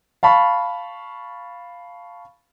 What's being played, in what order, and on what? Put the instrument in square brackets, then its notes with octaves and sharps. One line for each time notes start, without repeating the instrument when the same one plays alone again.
[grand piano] F5 A5 B5 C#6